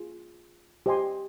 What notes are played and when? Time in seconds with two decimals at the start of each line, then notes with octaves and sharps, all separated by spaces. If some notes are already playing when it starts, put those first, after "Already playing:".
Already playing: F4 G#4
0.86 G4 C5 D#5 G#5 C6